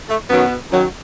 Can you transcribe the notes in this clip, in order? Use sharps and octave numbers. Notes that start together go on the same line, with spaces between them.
A3
F#2 B2 D#3 F#3 B3
F#2 D#3 F#3